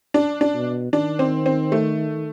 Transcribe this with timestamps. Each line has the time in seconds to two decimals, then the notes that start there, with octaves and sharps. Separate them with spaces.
0.14 D4
0.41 D4
0.54 B2
0.92 D#3 D4
1.19 C4
1.46 C4
1.72 A3